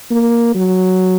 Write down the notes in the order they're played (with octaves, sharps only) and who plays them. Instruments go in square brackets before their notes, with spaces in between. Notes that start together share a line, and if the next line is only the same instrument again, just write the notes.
[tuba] A#3
F#3